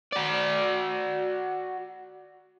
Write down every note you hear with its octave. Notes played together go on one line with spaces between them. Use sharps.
F#4 D5